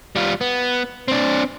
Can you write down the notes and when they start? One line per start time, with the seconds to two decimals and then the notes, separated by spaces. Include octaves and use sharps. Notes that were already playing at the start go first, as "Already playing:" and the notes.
0.16 G3 F4
0.41 B3
1.08 C4 D4